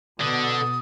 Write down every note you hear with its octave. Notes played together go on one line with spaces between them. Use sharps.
B2 D3 D#6